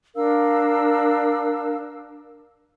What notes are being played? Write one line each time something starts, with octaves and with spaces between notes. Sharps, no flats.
D4 A#4 F5 E6